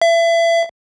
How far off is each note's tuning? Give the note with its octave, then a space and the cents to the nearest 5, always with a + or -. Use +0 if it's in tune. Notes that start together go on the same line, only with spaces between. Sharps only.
E5 +30